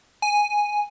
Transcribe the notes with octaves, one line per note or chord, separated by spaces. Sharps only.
G#5